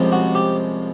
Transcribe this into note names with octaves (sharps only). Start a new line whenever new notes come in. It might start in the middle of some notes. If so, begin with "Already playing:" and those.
Already playing: C2 C3 F3 G#3 C#4
F#4
G4